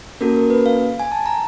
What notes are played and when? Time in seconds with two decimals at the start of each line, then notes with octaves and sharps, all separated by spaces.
0.21 A#3 C#4 F#4 A4 A#4
0.36 A#4
0.50 B4
0.66 F5
0.99 G#5
1.12 A5
1.26 A#5